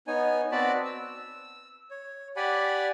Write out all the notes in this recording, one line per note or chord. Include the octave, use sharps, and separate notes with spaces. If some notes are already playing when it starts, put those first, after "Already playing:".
B3 D#4 C#5 G#5
B3 C4 F#4 D5 A5 B5
E6
C#5
G4 D5 F#5 G#5 B5